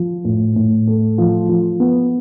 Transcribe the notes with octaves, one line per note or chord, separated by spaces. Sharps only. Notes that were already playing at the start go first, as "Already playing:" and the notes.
Already playing: F3
A2
A2
A3
F3
F3
B3